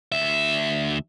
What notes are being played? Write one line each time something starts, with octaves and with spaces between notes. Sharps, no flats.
D2 E5